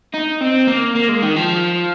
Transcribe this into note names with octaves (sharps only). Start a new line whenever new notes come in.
D#4
C4
A#3
A#3
G#3
D#3
F3